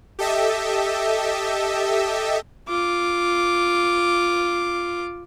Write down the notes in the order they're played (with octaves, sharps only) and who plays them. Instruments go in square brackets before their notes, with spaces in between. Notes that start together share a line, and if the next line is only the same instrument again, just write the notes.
[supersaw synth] G4 A4 D#5 E5
[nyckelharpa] F4 D6